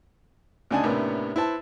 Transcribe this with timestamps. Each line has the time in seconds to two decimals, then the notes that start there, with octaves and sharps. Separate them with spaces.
0.71 D2 C#3 D4 D#4 G#5 A5
0.84 A2 C3 A#3 B3 C#4 D4
1.36 E4 B4 C5 A5